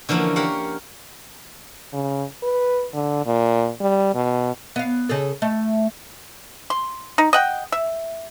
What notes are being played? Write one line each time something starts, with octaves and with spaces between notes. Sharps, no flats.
D3 E3 F3 A#3 C#4 D4
G4 A#4 C#5 F5 F#5
C#3
B4
D3
A#2
G3
B2
B3 F5
C#3 G#4 A4
A3
C6
D#4
D#5 F#5 G5
E5